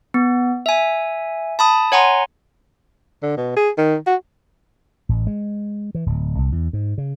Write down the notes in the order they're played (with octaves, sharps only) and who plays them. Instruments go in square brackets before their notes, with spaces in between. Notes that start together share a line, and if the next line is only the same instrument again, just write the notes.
[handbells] B3
E5 G#5
A5 B5 D#6
C#5 F#5 G#5 A#5 C6
[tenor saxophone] D3
B2
G#4
D#3
F#4
[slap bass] A1
G#3
E3
D1
C2
E2
G#2
C#3